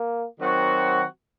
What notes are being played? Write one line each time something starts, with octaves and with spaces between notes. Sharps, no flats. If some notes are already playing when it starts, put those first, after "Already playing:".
Already playing: A#3
D#3 F#3 C4 F#4